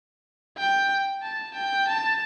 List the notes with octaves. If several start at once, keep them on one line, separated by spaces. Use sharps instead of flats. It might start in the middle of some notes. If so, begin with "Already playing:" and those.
G5
A5
G5
A5